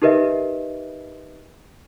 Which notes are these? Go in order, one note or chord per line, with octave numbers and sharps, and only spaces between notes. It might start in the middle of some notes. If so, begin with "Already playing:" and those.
D#4 G4 A#4 B4 D#5 E5